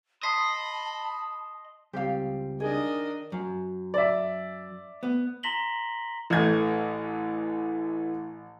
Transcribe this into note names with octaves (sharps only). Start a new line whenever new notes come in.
D#5 A5 B5 C6 B6 C7
C#2 G3 C4 G4 F5
D#3 D4 G#4 D#5
F#2
D5 E5
B3
A#5 C6 A#6 B6 F#7 G7
A1 E3 A3 G#6